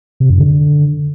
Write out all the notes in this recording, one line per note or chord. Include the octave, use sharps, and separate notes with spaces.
C3
F#2
D3